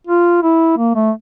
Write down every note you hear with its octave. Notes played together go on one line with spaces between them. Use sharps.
F4
E4
A#3
A3